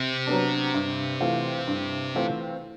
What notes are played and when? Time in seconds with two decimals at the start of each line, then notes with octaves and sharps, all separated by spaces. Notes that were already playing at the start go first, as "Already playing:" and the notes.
Already playing: C3
0.27 F#3 B3 D4
0.74 G2
1.20 E3 A3 C4 F4
1.67 G2
2.15 E3 A3 C4 F4